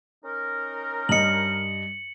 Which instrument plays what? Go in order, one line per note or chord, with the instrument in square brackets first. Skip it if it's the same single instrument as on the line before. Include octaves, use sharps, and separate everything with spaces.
[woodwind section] C#4 D#4 A#4
[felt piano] G2 D#5 [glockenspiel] C#7 F#7